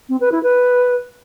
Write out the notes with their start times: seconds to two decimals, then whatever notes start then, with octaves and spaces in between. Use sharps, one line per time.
0.09 C4
0.20 B4
0.32 E4
0.43 B4